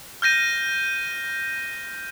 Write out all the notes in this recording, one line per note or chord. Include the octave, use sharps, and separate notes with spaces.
F6 G6 A#6 D#7